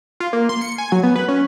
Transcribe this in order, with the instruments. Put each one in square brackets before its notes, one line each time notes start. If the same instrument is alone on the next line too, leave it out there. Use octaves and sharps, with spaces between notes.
[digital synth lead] F4
A#3
C6
C#7
G#5
F#3
B3
B4
C#4